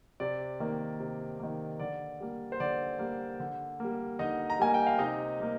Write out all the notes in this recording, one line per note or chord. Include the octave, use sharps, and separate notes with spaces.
C3 D5
D#3 A#3
C3
D#3 A#3
D3 D5
G3 A#3
C5
D3 D5
G3 A#3
D3
G3 A#3
D3 D#4 D#5
A#5
G3 A#3 G#5
G5
F5
C3 D#4 D#5
G3 A#3